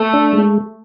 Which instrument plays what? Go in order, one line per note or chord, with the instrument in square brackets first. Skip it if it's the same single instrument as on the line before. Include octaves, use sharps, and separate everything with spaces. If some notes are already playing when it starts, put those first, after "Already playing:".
Already playing: [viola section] A3
[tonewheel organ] D4
G#3